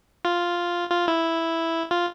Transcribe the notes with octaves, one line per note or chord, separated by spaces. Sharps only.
F4
F4
E4
F4